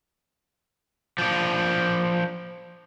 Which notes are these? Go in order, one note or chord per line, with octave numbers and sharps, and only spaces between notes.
F3 D4